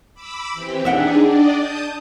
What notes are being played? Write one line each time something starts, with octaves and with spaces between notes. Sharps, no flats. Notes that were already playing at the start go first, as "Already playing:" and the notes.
B5 D6 E6
E3 C4 G4
D4 D#4 G#4 E5 F#5 G5
D4 D5 D#5
A5 D#6 G6